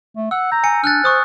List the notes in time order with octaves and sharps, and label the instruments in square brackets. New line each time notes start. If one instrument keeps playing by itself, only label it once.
[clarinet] A3
[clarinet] F#5 [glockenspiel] E6
[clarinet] A#5 [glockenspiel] G6
[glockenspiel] G#5 C#7
[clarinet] D4 [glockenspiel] F6 F#6 A6
[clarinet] C5 [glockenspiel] C#6 D#6 F#6